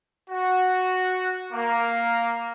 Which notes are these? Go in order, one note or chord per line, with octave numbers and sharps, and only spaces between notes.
F#4
A#3